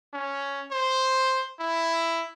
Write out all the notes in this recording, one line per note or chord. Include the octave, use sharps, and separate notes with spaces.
C#4
C5
E4